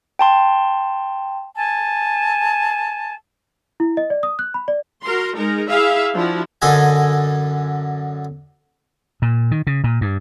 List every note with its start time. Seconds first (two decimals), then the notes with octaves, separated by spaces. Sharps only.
0.19 G5 A5 C6
1.56 G#5 A5
3.80 E4
3.97 D#5
4.10 D5
4.23 D#6
4.39 F#6
4.54 B5
4.68 D5
5.03 F#4 A#4 C6
5.35 G#3 D#4 A#4
5.68 E4 G#4 E5 F5
6.14 F3 D4 E4 F#4
6.62 F#2 D3 A4 D#5 G#5
9.22 A#2
9.51 D#3
9.67 C#3
9.84 A#2
10.01 G2